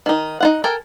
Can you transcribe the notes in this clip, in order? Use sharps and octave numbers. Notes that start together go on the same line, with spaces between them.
D#3 D#4
D#4 F4 F#5
A4 A#4 G5 G#5